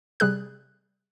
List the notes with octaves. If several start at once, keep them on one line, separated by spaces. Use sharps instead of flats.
C3 G3 G#4 F#6